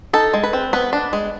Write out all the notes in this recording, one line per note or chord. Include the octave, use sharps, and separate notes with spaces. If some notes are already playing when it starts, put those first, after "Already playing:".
D#4 A4
G#3
B4
C4
B3 B4
D4
G#3